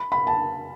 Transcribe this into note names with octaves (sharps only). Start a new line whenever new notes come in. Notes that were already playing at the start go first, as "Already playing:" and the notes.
Already playing: B5
B5
A5